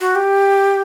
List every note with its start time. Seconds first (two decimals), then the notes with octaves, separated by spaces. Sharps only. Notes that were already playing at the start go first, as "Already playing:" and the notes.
0.01 F#4
0.15 G4